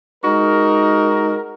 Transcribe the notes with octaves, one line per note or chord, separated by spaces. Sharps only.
G#3 D#4 F#4 A#4